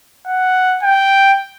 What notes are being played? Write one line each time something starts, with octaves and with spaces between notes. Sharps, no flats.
F#5
G5